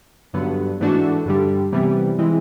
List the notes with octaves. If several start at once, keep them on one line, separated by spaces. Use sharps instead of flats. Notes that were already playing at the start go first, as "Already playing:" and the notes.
G2 D3 F#3 B3
G#2 E3 A3 D4 F#4
G2 D3 G3
C3 E3 G3 B3
E3 G#3 C4 E4